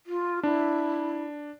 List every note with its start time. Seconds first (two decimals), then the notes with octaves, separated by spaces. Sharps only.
0.06 F4
0.43 D4 E4